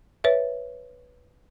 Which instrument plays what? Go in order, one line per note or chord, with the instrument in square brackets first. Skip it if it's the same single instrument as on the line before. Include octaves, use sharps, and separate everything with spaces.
[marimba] B4 C#5 E5